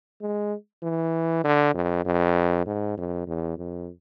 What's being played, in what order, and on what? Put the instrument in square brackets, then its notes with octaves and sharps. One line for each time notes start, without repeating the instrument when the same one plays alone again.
[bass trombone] G#3
E3
D3
F2
F2
G#2
F2
E2
F2